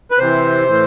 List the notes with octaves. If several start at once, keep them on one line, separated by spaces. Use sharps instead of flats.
B4
C3 E3 C5
A2 E3